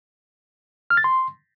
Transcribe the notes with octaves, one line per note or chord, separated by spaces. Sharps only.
F6
A6
C6